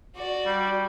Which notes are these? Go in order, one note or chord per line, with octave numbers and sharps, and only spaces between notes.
F#4 D5
G3